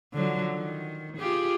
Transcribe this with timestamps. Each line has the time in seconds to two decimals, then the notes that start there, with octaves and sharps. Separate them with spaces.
0.14 D3 F3 F#3
0.54 D#3
1.18 F4 G4 G#4